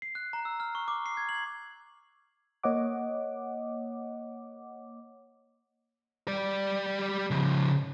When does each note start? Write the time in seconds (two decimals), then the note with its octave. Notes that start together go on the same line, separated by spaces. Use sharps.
0.02 C7
0.15 F#6
0.33 A#5
0.45 E6
0.60 F6
0.75 C#6
0.88 D6
1.06 C7
1.17 G#6
1.29 F#7
2.63 A#3 C#5 D#5 F#5 D6
6.28 G3 D5
7.31 C#3 F3